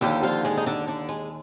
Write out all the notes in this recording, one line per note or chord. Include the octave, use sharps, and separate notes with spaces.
D#2 D3 F3 G3 G4
F3 F4
G#3 G#4
D#4
D3 D4
D3 D4
G#3